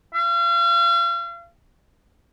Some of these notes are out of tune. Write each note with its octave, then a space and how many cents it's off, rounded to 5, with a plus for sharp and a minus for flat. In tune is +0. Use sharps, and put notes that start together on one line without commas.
F5 -40